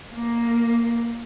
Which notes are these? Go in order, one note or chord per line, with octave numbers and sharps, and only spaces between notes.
A#3